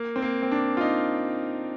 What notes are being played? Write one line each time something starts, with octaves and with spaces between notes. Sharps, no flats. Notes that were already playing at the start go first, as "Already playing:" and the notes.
Already playing: A#3
C4
A#3
C4
D4
F4
D#4